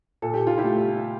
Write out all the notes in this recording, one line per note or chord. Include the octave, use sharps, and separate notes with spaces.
A#2 A4
G4
F4
E4 G4
A3